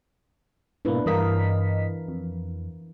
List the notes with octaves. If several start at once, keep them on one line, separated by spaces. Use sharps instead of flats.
G#2 B2 A#3 D4 E4 B4
G2 E3 A#4 D#5 F5 B6
F2